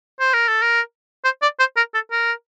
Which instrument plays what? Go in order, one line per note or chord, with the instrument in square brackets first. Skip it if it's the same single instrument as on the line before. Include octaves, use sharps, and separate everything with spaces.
[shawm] C5
A#4
A4
A#4
C5
D5
C5
A#4
A4
A#4